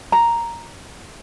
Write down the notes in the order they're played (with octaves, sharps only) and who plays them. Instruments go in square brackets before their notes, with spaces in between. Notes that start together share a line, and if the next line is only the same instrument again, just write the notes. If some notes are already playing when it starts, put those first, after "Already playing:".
[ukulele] A#5